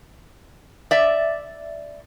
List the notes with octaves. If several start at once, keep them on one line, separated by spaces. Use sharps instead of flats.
D5 E5